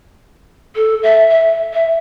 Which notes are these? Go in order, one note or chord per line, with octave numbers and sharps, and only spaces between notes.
A4
E5
E5
E5